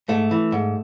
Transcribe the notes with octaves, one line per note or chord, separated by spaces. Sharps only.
G#2 A3
E3
G#2